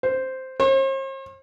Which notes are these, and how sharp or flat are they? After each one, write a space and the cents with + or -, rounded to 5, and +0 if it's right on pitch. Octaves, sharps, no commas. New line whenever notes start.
C5 -5
C5 +45